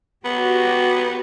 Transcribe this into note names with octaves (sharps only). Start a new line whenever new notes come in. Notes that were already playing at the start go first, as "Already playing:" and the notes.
B3 F#4 G4